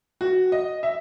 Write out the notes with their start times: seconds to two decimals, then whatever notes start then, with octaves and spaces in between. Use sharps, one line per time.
0.21 F#4
0.52 D#5
0.83 E5